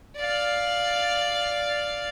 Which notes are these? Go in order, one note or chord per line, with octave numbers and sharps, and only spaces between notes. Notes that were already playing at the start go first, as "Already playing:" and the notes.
D5 F5